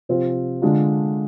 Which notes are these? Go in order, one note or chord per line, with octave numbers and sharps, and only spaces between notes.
C3 F3 C4 F4
D3 G#3 D4 F4